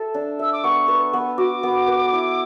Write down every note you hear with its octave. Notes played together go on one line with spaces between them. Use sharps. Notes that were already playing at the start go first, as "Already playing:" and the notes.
Already playing: A4 E5
D4
E5 E6
D6
B3 C#6
B4
B3
F#4 D6
B3
B4
E4